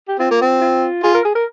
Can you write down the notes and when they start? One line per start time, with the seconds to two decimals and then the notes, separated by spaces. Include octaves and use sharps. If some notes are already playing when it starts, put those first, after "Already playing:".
0.08 G4
0.19 C4 F4
0.31 A#3
0.42 C4
0.61 F4
1.03 F4 G#4
1.14 A#4
1.25 G#4
1.35 A#4